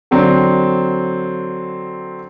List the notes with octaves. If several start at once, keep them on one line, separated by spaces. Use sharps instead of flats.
D3 F#3 C4